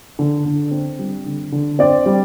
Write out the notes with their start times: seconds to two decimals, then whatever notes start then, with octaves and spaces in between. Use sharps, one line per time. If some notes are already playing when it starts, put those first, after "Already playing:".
0.19 D3
0.45 D3
0.71 C4
0.99 G3
1.26 D3
1.52 D3
1.79 C4 D5
2.06 G3